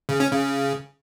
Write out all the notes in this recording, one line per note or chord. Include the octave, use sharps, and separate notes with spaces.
C#3
C#4
C#3